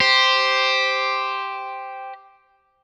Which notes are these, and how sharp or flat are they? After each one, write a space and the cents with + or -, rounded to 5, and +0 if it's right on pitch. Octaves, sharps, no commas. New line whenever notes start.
G4 +0 C5 +0